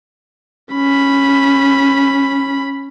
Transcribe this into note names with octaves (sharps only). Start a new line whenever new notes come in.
C#4 B5